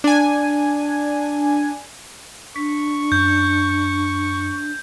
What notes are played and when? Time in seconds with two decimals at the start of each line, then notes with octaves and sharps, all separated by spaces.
0.04 D4 G#5
2.56 D4 C#6 B6
3.12 F#2 G6